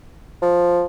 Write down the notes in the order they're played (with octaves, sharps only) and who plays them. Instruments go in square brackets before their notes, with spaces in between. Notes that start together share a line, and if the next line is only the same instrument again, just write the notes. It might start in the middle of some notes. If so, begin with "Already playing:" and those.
[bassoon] F3